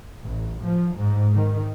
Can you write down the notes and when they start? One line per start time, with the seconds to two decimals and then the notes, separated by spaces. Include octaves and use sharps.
0.25 A1
0.64 F3
0.96 G#2
1.34 D#3